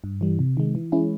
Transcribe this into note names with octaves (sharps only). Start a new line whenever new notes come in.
G2
E3 G3
C3
D#3 G#3
E3
G#3 C#4 E4